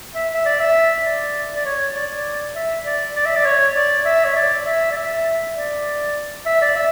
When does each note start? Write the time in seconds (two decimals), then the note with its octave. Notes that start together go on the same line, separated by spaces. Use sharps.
0.15 E5
0.34 E5
0.45 D5
0.60 E5
1.05 D5
1.55 D5
1.65 C#5
1.95 D5
2.10 D5
2.55 E5
2.85 D5
3.16 D5
3.25 E5
3.35 D5
3.46 C#5
3.76 D5
4.06 E5
4.24 C#5
4.36 D5
4.66 E5
4.91 D5
4.96 E5
5.56 D5
6.46 E5
6.61 D5
6.76 E5